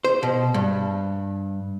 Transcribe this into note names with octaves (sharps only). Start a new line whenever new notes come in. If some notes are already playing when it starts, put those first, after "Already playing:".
C5
B2
G2